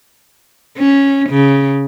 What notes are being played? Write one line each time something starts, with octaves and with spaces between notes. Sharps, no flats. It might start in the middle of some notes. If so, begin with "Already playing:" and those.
C#4
C#3